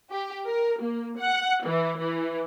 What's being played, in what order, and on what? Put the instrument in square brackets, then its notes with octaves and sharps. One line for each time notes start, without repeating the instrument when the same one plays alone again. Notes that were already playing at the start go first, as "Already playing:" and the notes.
[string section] G4
A#4
A#3
F#5
E3
E3